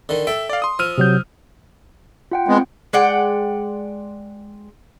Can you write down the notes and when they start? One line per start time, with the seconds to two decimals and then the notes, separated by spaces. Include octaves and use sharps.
0.09 D3 D#3
0.27 A4 E5 G5
0.49 D5 F5
0.62 C6 D#6
0.79 F3 E6 F6 D#7
0.98 C3 F#3 G6
2.31 F4 F#5 G5
2.48 G#3 B3 C4
2.93 G#3 D5 F#5 G5